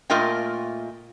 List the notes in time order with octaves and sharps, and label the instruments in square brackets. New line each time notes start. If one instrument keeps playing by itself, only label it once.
[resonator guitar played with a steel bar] A#2 A3 F4 A#4 D#5 G5